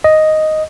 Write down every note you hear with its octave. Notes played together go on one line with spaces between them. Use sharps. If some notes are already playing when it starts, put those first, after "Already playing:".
D#5